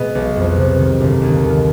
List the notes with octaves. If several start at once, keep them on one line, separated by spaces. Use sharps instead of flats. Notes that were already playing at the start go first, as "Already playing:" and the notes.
Already playing: B2 G#3 B3 D#5
B1
F2
C3
D#3
G1
D#2
D#3